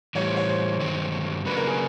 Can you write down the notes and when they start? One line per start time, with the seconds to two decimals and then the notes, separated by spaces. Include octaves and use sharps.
0.15 A2 E3 G3 C#5
0.26 C5
0.37 C#5
0.48 C5
0.80 G2 D#3 F#3
1.45 C#3 F#3 A#3 D4 B4
1.57 A#4
1.67 G#4